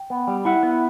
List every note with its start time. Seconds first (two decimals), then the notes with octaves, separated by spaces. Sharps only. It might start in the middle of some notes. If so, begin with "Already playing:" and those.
Already playing: G5
0.10 B3
0.28 G3
0.45 E4 F#5
0.63 B3